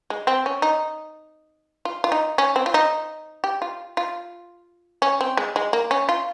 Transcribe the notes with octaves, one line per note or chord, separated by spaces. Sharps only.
G#3
C4
C#4
D#4
F4
F4
D#4
C#4
C4
F4
D#4
G4
F4
F4
C#4
C4
G#3
G#3
A#3
C#4
F4